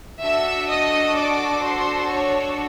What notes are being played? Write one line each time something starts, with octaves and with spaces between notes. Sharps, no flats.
D4 F#4 A4 E5 E6
D#5 D#6
D5 D6
C5 C6
C#5 C#6